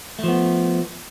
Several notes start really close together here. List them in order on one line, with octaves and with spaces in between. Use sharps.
A3 F3 B3